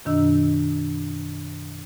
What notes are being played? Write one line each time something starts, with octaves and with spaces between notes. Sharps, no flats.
F#2 B2 D#3 D4 D#5 E6